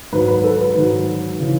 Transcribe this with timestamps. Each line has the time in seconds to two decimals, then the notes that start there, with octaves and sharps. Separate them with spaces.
0.12 G#2 D#3 F#3 B4
0.28 B4
0.44 A4
0.59 B4
0.75 G#2 D#3 F#3
1.40 C#3 E3